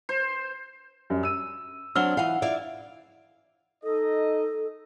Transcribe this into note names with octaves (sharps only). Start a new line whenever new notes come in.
C5
F#2 G3
E6 D#7
F#3 C4 D4 F6 G7
E3 F5 F#5
E4 D5 F5
D#4 A4 D#5